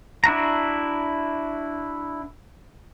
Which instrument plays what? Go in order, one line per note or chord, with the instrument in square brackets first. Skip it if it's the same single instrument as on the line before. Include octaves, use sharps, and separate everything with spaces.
[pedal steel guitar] D4 E4 F#4 A#5